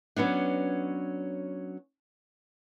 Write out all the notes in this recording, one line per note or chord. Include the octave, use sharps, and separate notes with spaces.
F#3 B3 C#4 D4